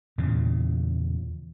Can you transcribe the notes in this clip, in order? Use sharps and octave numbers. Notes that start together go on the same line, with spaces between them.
E2 A#2 C#3